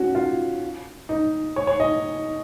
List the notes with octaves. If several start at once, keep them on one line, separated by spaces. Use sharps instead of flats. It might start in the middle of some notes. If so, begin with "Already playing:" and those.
Already playing: C#4 F#4
F4
D#4
C#5
C#5
D#5